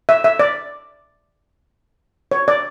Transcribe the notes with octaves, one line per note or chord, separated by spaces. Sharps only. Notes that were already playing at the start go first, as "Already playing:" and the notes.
E5
E5
D5
C#5
D5